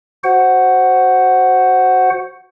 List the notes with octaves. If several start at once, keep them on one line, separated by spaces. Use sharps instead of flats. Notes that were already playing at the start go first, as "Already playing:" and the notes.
F#4 C5 F#5